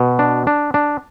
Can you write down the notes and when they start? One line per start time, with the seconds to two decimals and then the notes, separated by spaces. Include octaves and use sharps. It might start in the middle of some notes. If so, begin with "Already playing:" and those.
Already playing: B2
0.19 D4
0.47 D4
0.74 D4